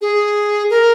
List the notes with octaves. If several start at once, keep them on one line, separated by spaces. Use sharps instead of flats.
G#4
A#4